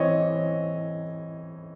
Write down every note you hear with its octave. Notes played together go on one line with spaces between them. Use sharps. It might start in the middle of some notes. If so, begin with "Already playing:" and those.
Already playing: E3 C4 C#5 D#5